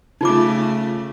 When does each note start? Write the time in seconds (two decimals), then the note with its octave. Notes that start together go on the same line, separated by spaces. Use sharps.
0.21 C#3 A3 D#4 F4 D6